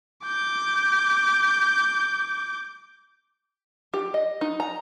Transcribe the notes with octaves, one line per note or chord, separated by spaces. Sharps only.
D6 G6
G4
D#5
D#4
A#5